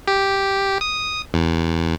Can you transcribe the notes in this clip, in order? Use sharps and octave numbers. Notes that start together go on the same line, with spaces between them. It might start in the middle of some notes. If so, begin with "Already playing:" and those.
G4
D#6
E2